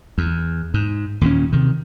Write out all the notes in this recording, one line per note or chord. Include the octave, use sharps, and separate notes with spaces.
E2
G#2
D#2 A#2 C#4
C3 D#3